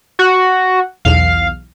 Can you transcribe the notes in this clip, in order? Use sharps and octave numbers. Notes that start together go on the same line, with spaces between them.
F#4
B1 E2 F5